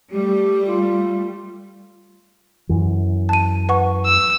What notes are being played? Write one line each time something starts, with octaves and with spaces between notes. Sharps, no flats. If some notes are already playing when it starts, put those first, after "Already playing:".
G3 A3 G4
F4
F#2 E3
A5 D#7
B4 F#5 C#6
E6